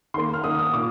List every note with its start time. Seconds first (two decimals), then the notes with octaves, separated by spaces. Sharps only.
0.14 D#3 A#3 C6
0.34 F6
0.44 D#3 A#3 D#6
0.59 D#6
0.73 A#2 D6